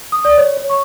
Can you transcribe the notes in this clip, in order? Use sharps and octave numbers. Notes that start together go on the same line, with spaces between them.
D#6
D5
C#5
C#5
C#6